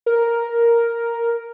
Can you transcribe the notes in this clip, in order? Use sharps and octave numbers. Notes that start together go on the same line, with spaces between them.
A#4